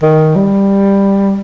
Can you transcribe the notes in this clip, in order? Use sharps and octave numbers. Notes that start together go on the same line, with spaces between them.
D#3
G3